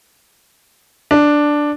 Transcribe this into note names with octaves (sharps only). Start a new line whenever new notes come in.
D4